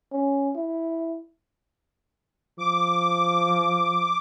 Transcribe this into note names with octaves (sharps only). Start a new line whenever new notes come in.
C#4
E4
F3 D6